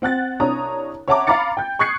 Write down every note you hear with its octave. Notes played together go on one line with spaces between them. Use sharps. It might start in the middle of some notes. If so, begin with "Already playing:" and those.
C4 F#5 F#6 A6
C2 D4 C#5 A#5 D#6
C#5 E5 F#5 A5 A#5 D6
F5 A#5 B5 D6 A6 C#7
G5 G6
C#6 D#6 F#6 G#6 C7 C#7